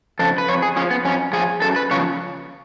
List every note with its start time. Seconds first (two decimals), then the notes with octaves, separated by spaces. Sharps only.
0.19 C#3 F3 A4
0.38 B4
0.48 F2 C#5
0.62 G#4
0.76 F3 C#4
0.91 B3
1.05 F2 C#4
1.33 F3 G#4
1.62 F#2 A4
1.76 B4
1.91 C#3 F3 C#5